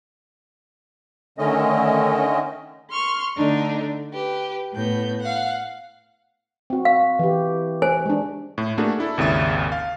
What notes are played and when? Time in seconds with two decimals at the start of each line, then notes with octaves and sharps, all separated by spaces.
1.38 D3 D#3 A3 C#4 D#5
2.89 C6 C#6 F6
3.36 D3 A3 D4 D#4
4.11 G4 B4
4.73 A2 B3 G6
5.21 F5 F#5
6.70 C4 F#4
6.85 F5
7.19 E3 G4
7.82 C5 G#5
8.05 G#3 D4
8.58 A2
8.78 A3 A#3 D4 F#4 G#4
8.98 D4 E4 A4
9.18 G#1 D#2 C#3 E5 A6
9.72 F5